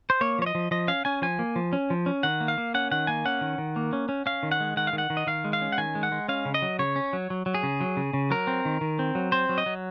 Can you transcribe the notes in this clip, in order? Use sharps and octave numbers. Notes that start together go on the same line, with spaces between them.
C5
A#3 C#5
F3 C#5
D#5
F3
F3 D#5
C#4 F5
C#4 G#5
F3 G#5
A#3
F3
C#4
F3
C#4
D#3 F#5
A#3
F5
A#3
C#4 F#5
D#3 F#5
A#3 G#5
C#4 F#5
D#3
D#3
A#3
C#4
C#4
C#4 F5
D#3
F#5
G#3
D#3 F#5
F5
D#3
F#5
D#3
D#5
D#3 F5
G#3
F5
C#4
F#5
D#3 G#5
G#3
F#5
G#3
C#4 F5
C#3
D#5
F#3
C#3 C#5
C#4
F#3
F#3
F#3
G#4
C#3
F#3
C#3
C#3
F#3 A#4
C4
D#3
D#3
C4
F#3
C4 C5
F#3
D#5
F#3